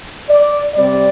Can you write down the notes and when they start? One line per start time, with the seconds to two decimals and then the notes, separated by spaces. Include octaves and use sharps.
0.29 D5
0.75 C3 G3 C4 D5